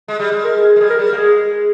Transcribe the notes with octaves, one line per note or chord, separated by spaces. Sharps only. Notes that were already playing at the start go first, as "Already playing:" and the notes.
G#3
G3
G#3
A#4
G#4
G#3
G3 G#4
A#4
G3
A#3
G#3 G#4